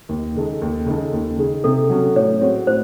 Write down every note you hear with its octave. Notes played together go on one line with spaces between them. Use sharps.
D#2
C#3 G#3 D#4 A4
D#2
C#3 G#3 D#4 A4
D#2
C#3 G#3 D#4 G#4
C3 A4
F#3 C#4
A2 C#5
G#3 C4 F#4
A2 C5